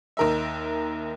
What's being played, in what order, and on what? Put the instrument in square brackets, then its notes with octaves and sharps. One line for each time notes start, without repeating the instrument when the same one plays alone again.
[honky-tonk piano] D#2 D#3 A#4 D#5 E5